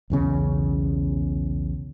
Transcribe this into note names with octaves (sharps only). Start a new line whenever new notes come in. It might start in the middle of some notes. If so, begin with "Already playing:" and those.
B1 E2 C#3 C#4